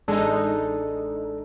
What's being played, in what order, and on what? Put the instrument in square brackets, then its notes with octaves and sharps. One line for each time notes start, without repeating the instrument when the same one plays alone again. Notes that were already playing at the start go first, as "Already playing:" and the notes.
[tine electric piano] A1 D4 A4 [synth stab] G#3 D#4